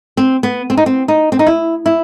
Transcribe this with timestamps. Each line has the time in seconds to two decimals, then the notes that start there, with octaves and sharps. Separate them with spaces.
0.17 C4
0.43 B3
0.70 C4
0.77 D#4
0.86 C4
1.08 D#4
1.32 C4
1.39 D#4
1.47 E4
1.86 E4